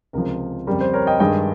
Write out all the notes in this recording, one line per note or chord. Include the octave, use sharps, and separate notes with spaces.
C#2 C3 F3 A#4
F2 C#3 G3 A#4
C5
A#4 C#5
D#5 G5
G2 D#3 G#3 D#5 G5